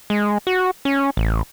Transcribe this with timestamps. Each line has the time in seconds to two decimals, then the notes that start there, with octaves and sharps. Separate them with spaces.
0.10 G#3
0.47 F#4
0.85 C#4
1.17 A1